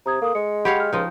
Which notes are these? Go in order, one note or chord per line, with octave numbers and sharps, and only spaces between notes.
C3 A#5 D#6 G#6
A#3 A4 D#6
G#3 C#7
G4 C#5 F5 F#5 B5
F6
C#2 F3 D#4